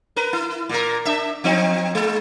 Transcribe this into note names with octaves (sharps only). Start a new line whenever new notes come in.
A#4 B4
E4
A#2 A#4
D4 E5
F3 C4 D#4
G#3